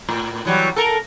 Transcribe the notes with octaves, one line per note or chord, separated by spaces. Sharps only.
A2
E3 F#3 G3
A4 A#4